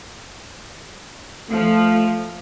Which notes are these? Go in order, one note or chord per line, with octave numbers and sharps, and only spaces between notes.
F3 A3